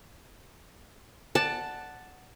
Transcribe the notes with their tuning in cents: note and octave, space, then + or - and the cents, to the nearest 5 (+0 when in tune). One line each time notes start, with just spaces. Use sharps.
D5 +20 F#5 +0 A5 +0